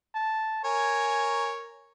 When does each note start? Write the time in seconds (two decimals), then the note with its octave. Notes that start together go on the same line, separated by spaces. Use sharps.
0.15 A5
0.65 A#4 C#5 G#5